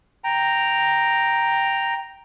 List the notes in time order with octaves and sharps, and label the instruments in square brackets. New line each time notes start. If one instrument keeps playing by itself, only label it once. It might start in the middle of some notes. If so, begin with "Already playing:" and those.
[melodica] G5 A#5